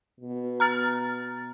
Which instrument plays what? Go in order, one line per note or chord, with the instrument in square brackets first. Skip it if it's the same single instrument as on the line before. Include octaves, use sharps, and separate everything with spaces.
[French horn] B2
[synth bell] A#5 F6 A6